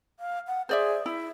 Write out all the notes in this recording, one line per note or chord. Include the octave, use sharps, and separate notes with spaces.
F5
F#5
G#4 C5 D5 E5
E4 E5